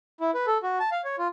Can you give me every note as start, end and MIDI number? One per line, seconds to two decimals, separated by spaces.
0.20 0.31 64
0.34 0.46 71
0.47 0.58 69
0.63 0.78 66
0.80 0.90 81
0.92 1.01 77
1.05 1.16 73
1.18 1.28 65